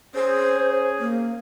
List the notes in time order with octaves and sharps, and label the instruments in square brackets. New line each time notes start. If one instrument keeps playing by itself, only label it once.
[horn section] C#4 G#4 [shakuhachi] C5
[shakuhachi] A#3